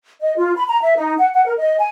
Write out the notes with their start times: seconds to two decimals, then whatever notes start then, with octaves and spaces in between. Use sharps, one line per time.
0.20 D#5
0.36 F4
0.56 B5
0.68 A#5
0.82 E5
0.97 D#4
1.18 F#5
1.33 F#5
1.46 A#4
1.57 D#5
1.78 G#5